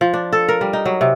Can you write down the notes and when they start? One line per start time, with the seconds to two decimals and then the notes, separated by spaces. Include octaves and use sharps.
0.01 F3
0.14 D4
0.33 A4
0.49 A#4
0.61 G3
0.73 D#4
0.85 F#3
1.01 C3